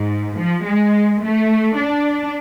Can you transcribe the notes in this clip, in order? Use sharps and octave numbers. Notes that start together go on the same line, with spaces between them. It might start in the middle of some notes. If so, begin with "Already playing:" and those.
Already playing: G#2
F3
G#3
A3
D4